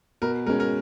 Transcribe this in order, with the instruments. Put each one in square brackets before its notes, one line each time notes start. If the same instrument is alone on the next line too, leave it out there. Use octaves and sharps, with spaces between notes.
[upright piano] B2 [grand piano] A#4
[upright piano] G#3 C#4 [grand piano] A#4
[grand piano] A#4